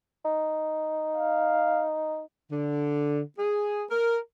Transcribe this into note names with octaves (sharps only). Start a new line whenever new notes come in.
D#4
F5
D3
G#4
A#4